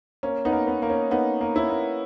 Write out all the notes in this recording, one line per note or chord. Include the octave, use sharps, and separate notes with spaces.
A#3 C#4
B3 D#4
A#3
B3
A#3
C#4
A#3 B3 D#4
A#3
C#4 E4
A#3